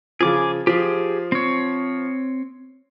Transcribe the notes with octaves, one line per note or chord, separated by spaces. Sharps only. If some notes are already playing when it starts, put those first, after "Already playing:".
C#3 F3 G#4 D6
F3 G4 G#4
C4 C#5